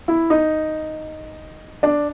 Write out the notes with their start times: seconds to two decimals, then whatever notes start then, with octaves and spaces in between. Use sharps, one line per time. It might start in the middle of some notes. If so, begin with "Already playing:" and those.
0.08 E4
0.30 D#4
1.83 D4